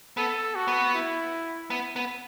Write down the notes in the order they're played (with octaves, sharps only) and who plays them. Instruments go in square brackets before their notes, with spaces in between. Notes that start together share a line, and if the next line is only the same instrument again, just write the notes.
[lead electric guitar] B3 [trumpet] A4
[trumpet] F#4
[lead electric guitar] B3
[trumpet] E4
[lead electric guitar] B3
B3